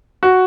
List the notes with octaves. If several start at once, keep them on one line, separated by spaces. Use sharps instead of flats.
F#4